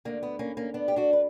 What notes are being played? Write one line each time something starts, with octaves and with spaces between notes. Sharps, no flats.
D2 D3 A#3
B3
A#3 C#4
A#3 C#4
B3 D4
G4
D4 F#4
B4